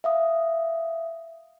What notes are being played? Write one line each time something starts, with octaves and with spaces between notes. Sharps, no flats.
E5 F5 D#6